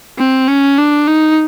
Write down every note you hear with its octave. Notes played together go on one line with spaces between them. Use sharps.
C4
C#4
D4
D#4